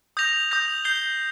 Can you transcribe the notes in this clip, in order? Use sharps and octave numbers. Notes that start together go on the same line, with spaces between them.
D#6 G6 A#6 F7
D#6 G6 A#6 F7
G6 C7 G7